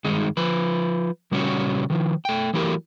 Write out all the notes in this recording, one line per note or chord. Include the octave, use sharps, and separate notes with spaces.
G2 D#3 G#3 D#4
F3 B4
A#2 C#3 G3 C#4 F#4 C#5
D#3 F3
A3 G5
E3 F#3 A3 E4 G4 A#4